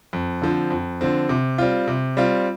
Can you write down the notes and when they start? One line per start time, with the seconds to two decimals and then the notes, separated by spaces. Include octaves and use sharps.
0.13 F2
0.42 D3 F3 C4
0.70 F2
1.01 D3 F3 C4
1.29 C3
1.58 G3 C4 F4
1.88 C3
2.17 G3 C4 F4